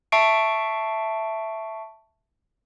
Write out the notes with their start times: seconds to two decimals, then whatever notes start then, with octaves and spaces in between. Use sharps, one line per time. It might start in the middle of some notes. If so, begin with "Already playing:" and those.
0.12 E5 A5 C#6 C7 D7